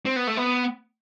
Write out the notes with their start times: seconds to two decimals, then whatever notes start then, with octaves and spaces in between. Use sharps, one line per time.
0.06 C4
0.16 B3
0.27 A3
0.37 B3